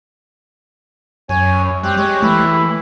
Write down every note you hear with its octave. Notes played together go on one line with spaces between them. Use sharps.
F#2 C#5 G#5
G3 C4 G4 F#6
G#3 C#5
E3 A3 E4